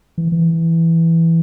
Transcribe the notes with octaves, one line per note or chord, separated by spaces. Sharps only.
E3
E3